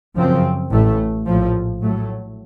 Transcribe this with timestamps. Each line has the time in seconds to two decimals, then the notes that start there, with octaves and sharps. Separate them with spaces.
0.15 F#2 C#3 F3 C4
0.70 A1 A2 A3
1.26 A#1 A2 F3
1.81 A2 F#3 A3